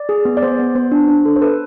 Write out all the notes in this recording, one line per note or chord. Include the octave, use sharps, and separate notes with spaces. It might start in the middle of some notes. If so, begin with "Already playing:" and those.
Already playing: D5
G#4
B3
D5
B3 C5
B3
B3 C5
D4
D4
A4
C5
A4 B4